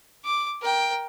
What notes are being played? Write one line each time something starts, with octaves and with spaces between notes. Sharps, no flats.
D6
A#4 G5